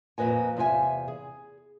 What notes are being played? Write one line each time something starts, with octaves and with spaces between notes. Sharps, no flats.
F2 A#2 B4 D#5 G#5
E2 C3 F4 E5 G#5
G#4